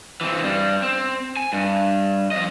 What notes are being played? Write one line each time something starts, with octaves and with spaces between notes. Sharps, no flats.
E3 C4
G2 G3
C4
G#5
G2
F2 D#5